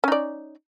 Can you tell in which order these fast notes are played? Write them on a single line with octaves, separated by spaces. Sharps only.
C#4 D#4 D5